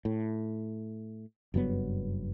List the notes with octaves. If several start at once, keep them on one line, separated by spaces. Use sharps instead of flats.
A2
F#1 G2 F#3 B3